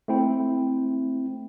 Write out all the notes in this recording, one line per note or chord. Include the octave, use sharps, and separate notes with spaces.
A3 C4 E4 G5